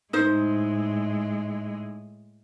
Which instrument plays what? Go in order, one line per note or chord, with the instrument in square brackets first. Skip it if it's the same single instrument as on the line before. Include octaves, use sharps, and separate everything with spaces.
[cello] A2 G#3 [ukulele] D#4 C5